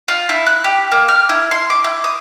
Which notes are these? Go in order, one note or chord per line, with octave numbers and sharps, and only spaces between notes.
F4
E4
F#6
G4
A#3
F6
E4
C6
D6
E4
D#6